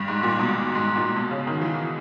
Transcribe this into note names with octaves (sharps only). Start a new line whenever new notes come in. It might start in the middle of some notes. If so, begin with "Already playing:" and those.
Already playing: G2
G#2
A#2
B2
G#2
A#2
B2
C#3
D#3
E3